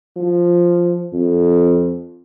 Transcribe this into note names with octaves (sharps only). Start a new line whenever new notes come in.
F3
F2